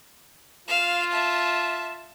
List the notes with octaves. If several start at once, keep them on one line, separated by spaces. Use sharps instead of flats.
F4 F5 E7
E5 A5